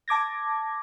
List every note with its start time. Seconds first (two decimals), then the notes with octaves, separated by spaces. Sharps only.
0.08 A5 D6 G#6 A#6